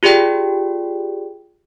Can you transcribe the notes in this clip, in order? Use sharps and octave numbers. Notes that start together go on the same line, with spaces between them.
F4 G4 G#4 D5 G5